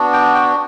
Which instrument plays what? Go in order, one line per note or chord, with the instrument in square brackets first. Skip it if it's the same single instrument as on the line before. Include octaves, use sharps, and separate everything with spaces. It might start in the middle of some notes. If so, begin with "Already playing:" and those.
Already playing: [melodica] B3 D4 F#4
G5
G5